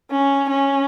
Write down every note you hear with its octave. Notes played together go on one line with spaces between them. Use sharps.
C#4
C#4